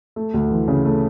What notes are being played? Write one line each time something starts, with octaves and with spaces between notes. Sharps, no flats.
A3
D2
E3
C#3
A3